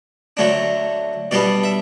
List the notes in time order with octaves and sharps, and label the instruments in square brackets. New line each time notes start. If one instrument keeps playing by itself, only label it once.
[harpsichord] D3 F#3 A3 D4
B2 G3 B3 D4 D5
E5